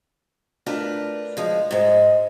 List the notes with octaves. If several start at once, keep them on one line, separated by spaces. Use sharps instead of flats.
A3 D4 F4 A#4 B4
F3 G#3
G#2 G#3